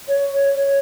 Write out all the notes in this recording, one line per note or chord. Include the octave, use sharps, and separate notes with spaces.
C#5
C#5